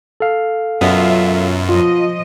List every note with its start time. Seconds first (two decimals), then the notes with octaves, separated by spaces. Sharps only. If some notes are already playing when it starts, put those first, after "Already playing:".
0.20 A4 F5
0.81 F#2 B2 B3 F4 E5
1.69 F3 F4 D#5